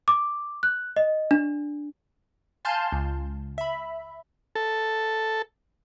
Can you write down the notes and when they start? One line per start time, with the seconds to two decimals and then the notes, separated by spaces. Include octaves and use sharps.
0.08 D6
0.63 F#6
0.96 D#5
1.31 D4
2.65 F5 G#5 A5 C6 F6 G6
2.92 C#2
3.58 E5 B5
4.56 A4